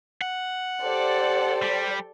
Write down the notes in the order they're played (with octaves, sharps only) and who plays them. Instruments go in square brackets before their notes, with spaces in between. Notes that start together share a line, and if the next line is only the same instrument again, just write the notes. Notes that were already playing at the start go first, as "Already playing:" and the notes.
[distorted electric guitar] F#5
[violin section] G4 A4 D5 [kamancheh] C5
[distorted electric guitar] G3